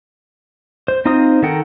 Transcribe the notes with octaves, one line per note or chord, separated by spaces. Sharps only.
C5
C4 D#4 F4 C5 D#6
D#3 A4 A#4 F#5 G5